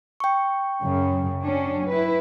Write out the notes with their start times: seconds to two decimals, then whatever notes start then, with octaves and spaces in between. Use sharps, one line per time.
0.20 G5 C#6
0.83 F#2 C#3
1.41 F#3 C#4 D4
1.88 E4 B4